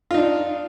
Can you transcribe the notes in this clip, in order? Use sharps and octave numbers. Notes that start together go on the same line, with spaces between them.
D4 D#4 F4